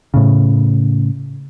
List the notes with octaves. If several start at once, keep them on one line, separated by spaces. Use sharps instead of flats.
A2 C#3